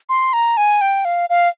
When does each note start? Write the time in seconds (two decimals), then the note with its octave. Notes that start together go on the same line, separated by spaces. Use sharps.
0.09 C6
0.33 A#5
0.57 G#5
0.81 G5
1.05 F5
1.30 F5